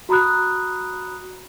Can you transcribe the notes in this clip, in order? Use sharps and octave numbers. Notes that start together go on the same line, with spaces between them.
F#4 A#5 B5 D#6 F#6